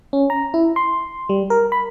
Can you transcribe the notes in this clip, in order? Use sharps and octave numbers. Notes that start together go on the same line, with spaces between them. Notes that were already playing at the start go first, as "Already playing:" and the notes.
C#4
A#5
E4
C6
G3
A#4
B5